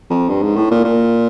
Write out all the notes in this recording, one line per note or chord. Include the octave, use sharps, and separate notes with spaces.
F2
G2
G#2
A2
A#2
A#2